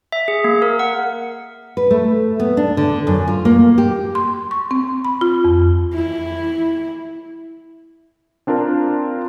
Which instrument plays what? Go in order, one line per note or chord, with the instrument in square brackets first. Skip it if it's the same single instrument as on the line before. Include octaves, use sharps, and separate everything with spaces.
[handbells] E5
G#4
A#3
A#4
F#5
[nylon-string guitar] B4
A3
B3
D4
D3
F#2
F4
A#3
G4
[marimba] C6
C#6
C4
B5
F4
F2
[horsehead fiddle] E4
[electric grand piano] C4 D4 F4 A#4